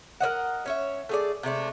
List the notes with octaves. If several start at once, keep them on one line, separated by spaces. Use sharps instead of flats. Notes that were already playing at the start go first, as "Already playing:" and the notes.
A#4 C5 D#5 F#5
C#4 C#5 E5
A3 G#4 D5
C3 G#3 A3 D4